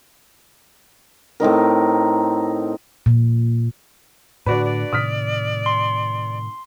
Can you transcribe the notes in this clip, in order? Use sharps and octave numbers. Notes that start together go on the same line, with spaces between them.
A2 C4 D#4 A#4
A#2
A2 D3 D4 F#4 B4 D5
D5
A2 C3 D#3 D#6 F6 B6
C6